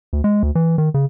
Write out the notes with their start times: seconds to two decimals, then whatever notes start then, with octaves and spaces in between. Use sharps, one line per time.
0.13 D2
0.24 G#3
0.43 D2
0.55 E3
0.78 D#3
0.94 C#3